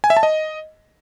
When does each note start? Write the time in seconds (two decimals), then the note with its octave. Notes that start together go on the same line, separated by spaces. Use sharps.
0.04 G#5
0.10 E5
0.17 A5
0.23 D#5